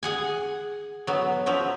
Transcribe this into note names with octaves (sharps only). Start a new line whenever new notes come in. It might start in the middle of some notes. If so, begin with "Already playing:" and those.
G#4 F#5 G#5
F#3 B3
F3 F#3 E5